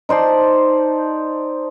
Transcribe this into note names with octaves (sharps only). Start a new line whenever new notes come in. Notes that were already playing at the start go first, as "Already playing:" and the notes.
D#4 C5 D5 A5